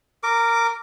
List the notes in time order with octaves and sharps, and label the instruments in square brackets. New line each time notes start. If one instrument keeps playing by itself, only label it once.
[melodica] A#4 D6